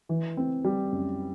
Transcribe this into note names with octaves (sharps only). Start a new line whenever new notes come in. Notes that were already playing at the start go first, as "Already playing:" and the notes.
E3
C4
G3
F#2